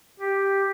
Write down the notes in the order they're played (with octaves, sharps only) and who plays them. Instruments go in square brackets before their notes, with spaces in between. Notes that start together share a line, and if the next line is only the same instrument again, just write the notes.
[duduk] G4